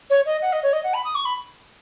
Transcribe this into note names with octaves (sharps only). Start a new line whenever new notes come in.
C#5
D#5
F#5
D#5
C#5
D#5
F#5
B5
D#6
C#6
B5